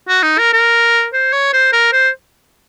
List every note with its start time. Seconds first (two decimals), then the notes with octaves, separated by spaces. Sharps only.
0.08 F#4
0.23 D#4
0.38 A#4
0.53 A#4
1.14 C5
1.33 C#5
1.53 C5
1.73 A#4
1.93 C5